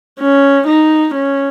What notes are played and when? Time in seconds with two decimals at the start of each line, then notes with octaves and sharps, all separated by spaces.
0.20 C#4
0.67 D#4
1.14 C#4